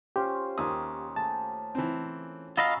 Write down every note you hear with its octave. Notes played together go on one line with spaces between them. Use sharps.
C#4 F4 G4 C5
D#2 D#6
A3 G4 G#4 A5
E3 C4
F4 F#4 D#5 F5 G#5 A#5 B5 E6